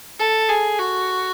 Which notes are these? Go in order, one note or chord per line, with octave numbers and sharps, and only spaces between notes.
A4
G#4
F#4